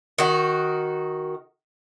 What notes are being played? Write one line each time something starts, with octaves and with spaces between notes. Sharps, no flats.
D#3 F#4